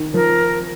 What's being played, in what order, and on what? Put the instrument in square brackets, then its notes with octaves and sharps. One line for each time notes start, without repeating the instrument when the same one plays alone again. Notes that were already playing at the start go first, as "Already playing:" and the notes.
Already playing: [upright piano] D#3
[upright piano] F3 [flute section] A#4